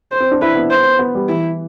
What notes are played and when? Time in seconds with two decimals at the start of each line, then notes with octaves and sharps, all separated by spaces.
0.12 C5
0.20 C4
0.31 D4
0.41 E4 B4
0.56 B3
0.71 C5
0.99 B3
1.15 G3
1.29 E3 E4